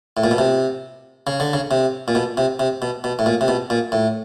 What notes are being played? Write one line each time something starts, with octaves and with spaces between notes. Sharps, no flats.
A2
A#2
B2
C3
C#3
D3
C#3
C3
A#2
B2
C3
C3
B2
B2
A2
A#2
C3
B2
A#2
A2